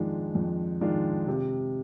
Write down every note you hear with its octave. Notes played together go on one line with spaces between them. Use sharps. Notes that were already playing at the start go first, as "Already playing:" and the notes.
Already playing: F2 D#3 G#3 D4 F4
F2
D#3 G#3 D4 F4
C3